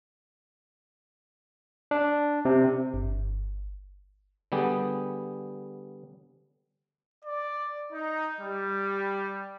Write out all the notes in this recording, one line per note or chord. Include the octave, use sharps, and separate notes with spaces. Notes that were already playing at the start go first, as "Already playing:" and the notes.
D4
C3
G1
D3 G3 B3 G4 G#4
D5
D#4
G3